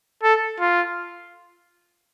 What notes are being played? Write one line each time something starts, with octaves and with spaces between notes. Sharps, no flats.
A4
F4